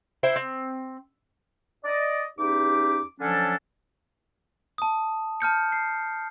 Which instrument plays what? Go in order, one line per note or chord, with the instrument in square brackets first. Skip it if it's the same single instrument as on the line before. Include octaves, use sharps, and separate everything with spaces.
[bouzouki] E4 C5 G5
C4
[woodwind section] D5 D#5
E2 C#4 D#4 G4 D6
D3 F3 F#3 C#4 D4 A4
[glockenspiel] A5 D#6
A5 F6 G6 C#7
C7